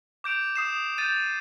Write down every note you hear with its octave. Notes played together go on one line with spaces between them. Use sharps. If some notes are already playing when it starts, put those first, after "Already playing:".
D6 G6 D7 F7
D#6 C7 E7
G6 A6 D#7